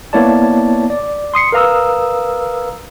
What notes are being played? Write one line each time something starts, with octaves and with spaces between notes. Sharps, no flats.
A#3 B3 E4 C#5 D5 A5
D5
C6 D#6 C7 C#7
A#4 B4 F5 A#5 D#6 E6